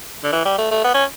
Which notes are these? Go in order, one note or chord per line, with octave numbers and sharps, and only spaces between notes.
D3
E3
G3
A3
A3
B3
C#4